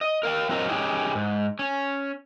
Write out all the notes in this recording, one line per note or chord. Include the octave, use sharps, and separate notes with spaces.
D#5
A#4 F5 G5
F#3 C4 F4 A#4 D#5 F5
C#4 D#4 G4 G#4
G#2
C#4